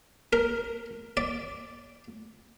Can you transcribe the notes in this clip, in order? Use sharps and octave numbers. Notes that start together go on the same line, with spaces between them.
A#4
D5